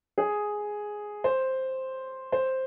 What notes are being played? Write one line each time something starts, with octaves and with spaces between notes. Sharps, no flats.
G#4
C5
C5